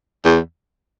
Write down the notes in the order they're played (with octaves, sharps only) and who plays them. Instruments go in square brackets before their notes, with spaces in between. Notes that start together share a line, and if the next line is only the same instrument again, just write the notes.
[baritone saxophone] E2